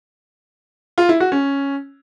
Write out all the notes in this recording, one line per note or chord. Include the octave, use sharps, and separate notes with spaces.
F4
E4
F#4
C#4